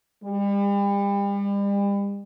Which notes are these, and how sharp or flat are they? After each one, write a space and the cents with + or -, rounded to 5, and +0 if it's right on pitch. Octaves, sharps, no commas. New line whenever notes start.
G3 +40